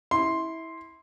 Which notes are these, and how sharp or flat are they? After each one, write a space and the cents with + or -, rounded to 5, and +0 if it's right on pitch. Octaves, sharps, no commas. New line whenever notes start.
E4 -20 C6 +0